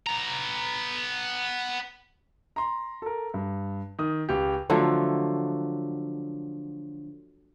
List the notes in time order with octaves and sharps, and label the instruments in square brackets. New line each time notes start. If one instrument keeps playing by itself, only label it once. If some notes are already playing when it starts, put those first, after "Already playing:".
[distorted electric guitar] B3 A#5
[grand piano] A#5 C6
A4 A#4
G2
D#3 D#6
C#2 G4
[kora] D3 F3 F#3 A3